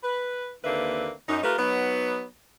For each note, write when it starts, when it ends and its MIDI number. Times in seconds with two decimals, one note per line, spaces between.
0.04 0.51 71
0.64 1.10 39
0.64 1.10 50
0.64 1.10 58
0.64 1.10 60
0.64 1.10 71
0.64 1.10 76
1.28 1.42 42
1.28 1.42 63
1.44 1.57 57
1.44 1.57 65
1.44 1.57 67
1.44 1.57 70
1.44 1.57 71
1.58 2.24 54
1.58 2.24 59
1.58 2.24 63